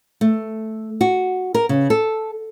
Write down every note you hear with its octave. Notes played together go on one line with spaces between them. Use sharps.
A3
F#4
A#4
C#3
A4